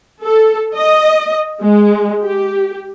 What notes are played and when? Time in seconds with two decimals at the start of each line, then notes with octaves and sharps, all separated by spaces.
0.23 A4
0.76 D#5
1.61 G#3
2.23 G4